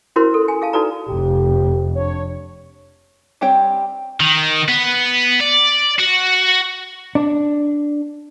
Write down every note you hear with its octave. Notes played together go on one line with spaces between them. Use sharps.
C#4 E4 F#4 A#4 C5 C6
A4
G#5
G#4 F5 A5
D#4 F#4 A4 B4 D5 A#5
F1 F2 G4
D4 C#5
G3 C4 G4 C#5 G5
D#3
B3
D5
F#4
D4